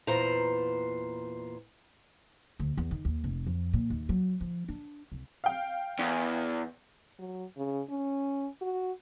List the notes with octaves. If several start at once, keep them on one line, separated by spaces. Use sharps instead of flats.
E2 A#2 B4 C5 A#5
D2
E2
D#3
D#2
F1
F2
A#2
D#2
F#3
F3
D4
C2
F5 G5
E2
F#3
C#3
C#4
F#4